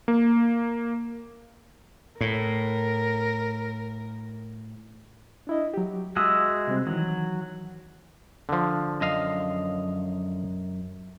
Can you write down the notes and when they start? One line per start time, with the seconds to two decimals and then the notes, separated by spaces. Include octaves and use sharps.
0.08 A#3
2.21 A2 A#4
5.47 D4 E4 D#5
5.74 F#3 G4
6.16 G#3 F#4 E5 D#6
6.67 C3 G3 C4
6.87 D#3 E3 F#3
8.49 D3 F3
9.01 F#2 D#5 F5